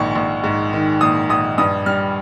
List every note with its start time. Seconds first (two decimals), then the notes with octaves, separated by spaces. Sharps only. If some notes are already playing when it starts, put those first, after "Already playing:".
Already playing: A#1 G#2 D#3 C#6
0.15 A#1
0.44 G#2
0.73 D#3
1.01 A#1 D#6
1.29 A#1 D#6
1.58 G2 D#6
1.86 G3 F6